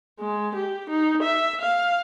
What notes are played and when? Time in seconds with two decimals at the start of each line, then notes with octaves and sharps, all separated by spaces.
0.20 G#3
0.55 G4
0.90 D#4
1.23 E5
1.61 F5